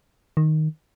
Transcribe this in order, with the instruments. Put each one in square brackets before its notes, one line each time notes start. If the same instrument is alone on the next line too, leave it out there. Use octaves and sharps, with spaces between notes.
[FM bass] D#3